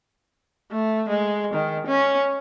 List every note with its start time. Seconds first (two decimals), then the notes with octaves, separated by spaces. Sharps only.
0.72 A3
1.10 G#3
1.54 D#3
1.87 C#4